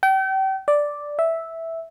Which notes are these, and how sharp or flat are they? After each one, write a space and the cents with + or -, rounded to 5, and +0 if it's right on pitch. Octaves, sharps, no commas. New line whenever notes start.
G5 -35
D5 +0
E5 -5